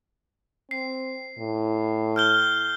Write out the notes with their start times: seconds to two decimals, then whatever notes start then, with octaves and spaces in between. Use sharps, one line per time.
0.71 C4 C7
1.39 A2
2.16 F6 G6 G7